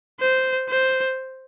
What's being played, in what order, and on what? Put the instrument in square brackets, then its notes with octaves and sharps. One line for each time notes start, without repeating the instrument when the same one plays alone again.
[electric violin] C5
C5